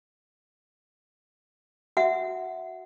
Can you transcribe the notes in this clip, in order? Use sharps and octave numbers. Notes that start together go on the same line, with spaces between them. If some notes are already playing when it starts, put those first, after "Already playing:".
F#4 E5 F#5